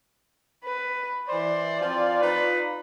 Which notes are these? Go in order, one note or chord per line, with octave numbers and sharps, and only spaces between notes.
B4
E3 C5 D5
F3 C4 F4
D#4 F4 B4